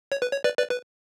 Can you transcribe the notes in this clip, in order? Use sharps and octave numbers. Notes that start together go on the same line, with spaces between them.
C#5
B4
C#5
B4 D5
B4 D5
B4